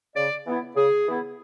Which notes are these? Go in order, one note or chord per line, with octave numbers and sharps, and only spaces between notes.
C#3 D5
E3 B3 E4
C#3 G#4
E3 B3 E4